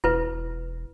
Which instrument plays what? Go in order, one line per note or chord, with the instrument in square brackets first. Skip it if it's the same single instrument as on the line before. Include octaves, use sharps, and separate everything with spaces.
[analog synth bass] E1 [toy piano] E4 B4